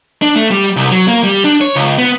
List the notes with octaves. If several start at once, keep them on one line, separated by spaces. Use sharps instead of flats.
D4
A3
G3
C2
F#3
A#3
G3
D4
C#5
C#2
B3